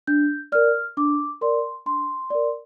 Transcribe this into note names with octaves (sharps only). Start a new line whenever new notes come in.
D4 G6
A#4 D5 F6
D4 D6
A#4 D5 C6
D4 C6
A#4 D5